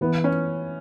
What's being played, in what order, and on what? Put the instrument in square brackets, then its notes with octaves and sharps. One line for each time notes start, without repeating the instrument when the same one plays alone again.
[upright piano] E3 [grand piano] B3
[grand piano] C#4